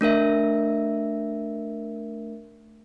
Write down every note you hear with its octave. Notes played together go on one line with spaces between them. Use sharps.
A3 D4 A#4 E5